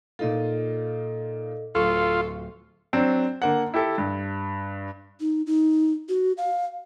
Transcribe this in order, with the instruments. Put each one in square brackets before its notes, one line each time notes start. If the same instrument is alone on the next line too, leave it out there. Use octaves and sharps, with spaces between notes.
[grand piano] A#2 D#4 F4 [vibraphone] A4 D#5
[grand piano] D1 C#6 [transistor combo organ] F4 [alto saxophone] A4
[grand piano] F#3 C4 D4
D3 A#3 F#5
E4 G4 A4
G2
[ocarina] D#4
D#4
F#4
F5